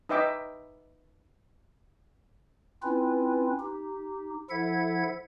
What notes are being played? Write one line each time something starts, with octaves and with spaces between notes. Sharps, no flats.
D#4 B4 D#5 E5 G5 D6
C4 C#4 E4 F4 B4
D#4 G4
F3 E4 A4 E5 F#5 G#6